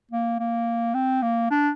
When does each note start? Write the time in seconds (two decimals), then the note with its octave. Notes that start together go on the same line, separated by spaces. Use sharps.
0.11 A#3
0.39 A#3
0.94 C4
1.23 A#3
1.51 D4